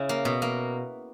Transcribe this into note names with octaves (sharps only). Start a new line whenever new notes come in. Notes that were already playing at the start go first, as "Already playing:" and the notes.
Already playing: C#3 E4
A#3
B2
A#3